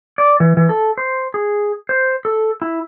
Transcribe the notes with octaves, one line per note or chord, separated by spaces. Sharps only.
D5
E3
E3
A4
C5
G#4
C5
A4
E4